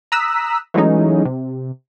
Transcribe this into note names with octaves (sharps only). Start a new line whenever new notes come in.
A#5 D#6 E6 F#6 B6
E3 F#3 G#3 A3 C#4 D#4
C3